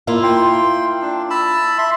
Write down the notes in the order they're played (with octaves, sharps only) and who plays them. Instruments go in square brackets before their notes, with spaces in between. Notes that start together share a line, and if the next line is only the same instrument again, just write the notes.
[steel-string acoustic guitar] A#3 E4 F4
[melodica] G5 C6
D4
A5 B5 E6
E5 C6